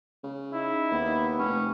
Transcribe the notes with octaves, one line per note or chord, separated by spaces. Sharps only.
C#3
D#4 E4
D#2 B3
F1 C#4